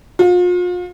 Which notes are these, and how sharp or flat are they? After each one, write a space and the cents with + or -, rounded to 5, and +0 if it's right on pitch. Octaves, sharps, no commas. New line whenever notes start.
F4 +40